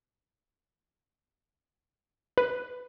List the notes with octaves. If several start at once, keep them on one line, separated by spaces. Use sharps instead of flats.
B4